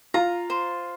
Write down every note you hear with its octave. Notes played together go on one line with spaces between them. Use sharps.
F4 A#5
C5